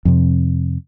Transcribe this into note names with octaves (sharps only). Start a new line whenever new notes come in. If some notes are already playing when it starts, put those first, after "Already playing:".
F2 C3